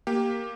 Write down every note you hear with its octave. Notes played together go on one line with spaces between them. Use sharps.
A#3 G4